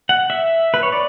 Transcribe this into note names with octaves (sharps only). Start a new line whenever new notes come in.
F#5
E5
B4
C#5
D5